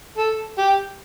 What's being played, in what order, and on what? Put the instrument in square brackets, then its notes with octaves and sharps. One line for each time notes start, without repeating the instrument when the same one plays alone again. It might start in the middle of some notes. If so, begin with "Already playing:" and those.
[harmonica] A4
G4